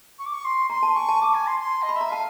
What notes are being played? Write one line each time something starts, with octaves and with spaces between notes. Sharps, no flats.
C#6
D6
C#6
C6
A#5 C6
A5
G#5 C#6
A5
A5 D6
G#5
C6
C6
D#5
B5
E5
A#5
F5 A5